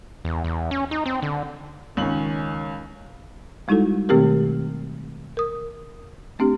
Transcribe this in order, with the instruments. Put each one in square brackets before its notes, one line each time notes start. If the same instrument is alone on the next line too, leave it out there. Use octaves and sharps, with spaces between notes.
[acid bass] E2
E2
C#4
D#4
C4
D3
[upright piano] C#2 F#7 [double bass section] D#3 C#4
[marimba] G3 G#3 D#4 E4 F#4 A4
B2 D#3 A3 C4 G4 A#4
A#4 D#6
A3 C4 D4 G4